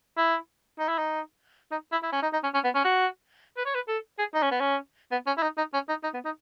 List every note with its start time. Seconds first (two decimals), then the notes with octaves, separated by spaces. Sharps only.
0.17 E4
0.79 D#4
0.88 E4
0.98 D#4
1.72 D#4
1.92 E4
2.03 E4
2.12 C#4
2.23 D#4
2.33 D#4
2.43 C#4
2.54 C#4
2.64 B3
2.75 C#4
2.85 F#4
3.57 B4
3.66 C#5
3.75 B4
3.88 A4
4.19 G#4
4.34 D#4
4.42 C#4
4.51 B3
4.60 C#4
5.11 B3
5.27 C#4
5.38 E4
5.43 D#4
5.58 D#4
5.73 C#4
5.89 D#4
6.04 D#4
6.14 B3
6.25 D#4